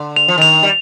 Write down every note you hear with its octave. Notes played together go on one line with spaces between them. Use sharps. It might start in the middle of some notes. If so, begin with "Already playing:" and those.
Already playing: D3
F7
F3
D#3 F7
G3